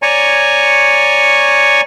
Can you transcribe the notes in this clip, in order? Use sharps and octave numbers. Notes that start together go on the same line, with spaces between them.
C#5 D5 G#5 A#5 C#6